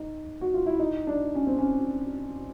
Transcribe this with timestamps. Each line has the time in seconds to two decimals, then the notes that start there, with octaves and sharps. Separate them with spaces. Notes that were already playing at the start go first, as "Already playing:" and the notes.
Already playing: D#4
0.41 F#4
0.54 F4
0.66 E4
0.80 D#4
1.07 D4
1.35 C#4
1.47 C4
1.59 C#4